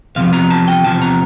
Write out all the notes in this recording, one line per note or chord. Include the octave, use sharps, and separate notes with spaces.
E2 C3 F3 F5
A#5
A5
G5
E2 C3 F3 A5
A#5